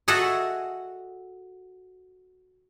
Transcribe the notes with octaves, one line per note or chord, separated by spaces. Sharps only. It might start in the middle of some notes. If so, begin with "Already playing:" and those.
F#4 G#4 A4 D#5 E5 F#5